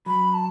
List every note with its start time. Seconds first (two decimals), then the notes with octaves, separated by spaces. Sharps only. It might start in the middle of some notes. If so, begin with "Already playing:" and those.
0.06 F#3 B5
0.34 A5